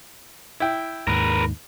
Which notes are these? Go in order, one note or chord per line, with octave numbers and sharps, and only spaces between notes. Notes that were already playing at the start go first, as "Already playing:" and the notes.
E4 G5
D#2 G#2 A#4 B4